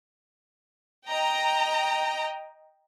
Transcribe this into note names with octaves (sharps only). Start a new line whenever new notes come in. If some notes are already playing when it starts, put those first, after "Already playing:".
D#5 G5 A#5